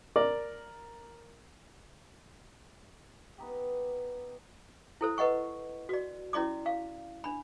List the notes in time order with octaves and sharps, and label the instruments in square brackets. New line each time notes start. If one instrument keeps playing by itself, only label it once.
[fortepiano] A#4 D5
[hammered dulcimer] B3 D#4 G4
[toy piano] E4 A4 C5
B4 D#5 F#5 C#6
F#4 D5
C#4 E4 D5 C6 D6
F5
D4 B5